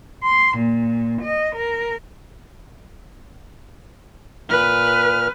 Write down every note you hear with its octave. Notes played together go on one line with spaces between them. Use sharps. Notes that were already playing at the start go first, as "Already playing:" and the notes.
C6
A#2
D#5
A#4
A#2 B4 F6